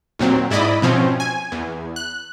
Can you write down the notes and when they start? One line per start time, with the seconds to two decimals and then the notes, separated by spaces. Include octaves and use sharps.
0.19 D#2 A#2 F#3 C4
0.51 G#2 E4 D5 D#5 B5
0.82 B2 F3 C4 C#4
1.20 G#5
1.52 E2
1.96 F#6